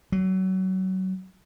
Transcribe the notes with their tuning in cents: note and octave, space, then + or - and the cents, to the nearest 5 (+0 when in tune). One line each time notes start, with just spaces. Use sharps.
F#3 +25